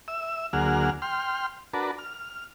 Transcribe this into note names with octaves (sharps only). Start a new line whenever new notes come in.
E5 E6
D2 F#3 A#3 G#4 F#5 F6
G5 C6 F6
D4 F#4 A#4 B4 A5
F6